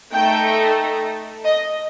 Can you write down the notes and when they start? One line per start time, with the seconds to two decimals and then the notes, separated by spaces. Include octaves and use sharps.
0.13 A3 D#4 A4 G5
1.45 D#5